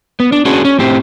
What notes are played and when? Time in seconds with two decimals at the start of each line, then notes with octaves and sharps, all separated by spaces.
0.20 B3
0.32 D4
0.45 C#4 D4 F#4 G#4
0.65 C#4
0.79 A2 C4 G4